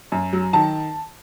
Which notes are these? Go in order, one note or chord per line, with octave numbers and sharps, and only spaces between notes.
F#2
F#3
D#3 A5